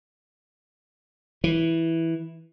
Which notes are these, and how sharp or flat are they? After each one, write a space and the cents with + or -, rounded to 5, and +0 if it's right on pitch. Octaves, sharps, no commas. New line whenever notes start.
E3 -5